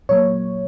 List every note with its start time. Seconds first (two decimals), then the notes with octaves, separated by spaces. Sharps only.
0.09 A#2 F#3 A#3 C#5